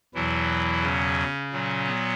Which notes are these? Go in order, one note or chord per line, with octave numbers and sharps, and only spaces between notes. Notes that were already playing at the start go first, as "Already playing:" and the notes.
E2 B2 E3 F#3 E4
C#3 C#4
A#2 F#3
B3